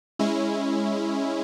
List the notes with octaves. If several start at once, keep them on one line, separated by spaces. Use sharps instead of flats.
G#3 C#4 E4